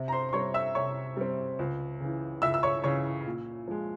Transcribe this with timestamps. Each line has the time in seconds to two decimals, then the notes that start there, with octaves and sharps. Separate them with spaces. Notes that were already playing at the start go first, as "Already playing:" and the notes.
Already playing: C3
0.08 A#5
0.12 C5 C6
0.29 C6
0.33 G3 C4 C#5 C#6
0.54 E5 E6
0.75 C3 C#5 C#6
1.17 G3 C4
1.59 C#2
2.00 C#3 E3
2.42 C#2 E5 E6
2.54 E6
2.63 C#5 C#6
2.83 C#3 E3 C#5 C#6
3.25 A#2
3.68 F3 G#3